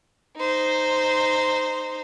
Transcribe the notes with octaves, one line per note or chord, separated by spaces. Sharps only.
D#4 C5